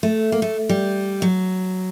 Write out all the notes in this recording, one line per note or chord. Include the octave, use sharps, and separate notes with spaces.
A3
A#3
A3
G3
F#3